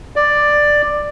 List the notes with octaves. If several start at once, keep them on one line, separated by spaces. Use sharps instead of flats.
D5